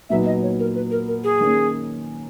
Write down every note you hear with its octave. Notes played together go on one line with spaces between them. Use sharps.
A#2 F#3 B3 D#4 E5
D#5
C#5
A#4
B4
A#4
A#4
G#4
D#3 A#3 C#4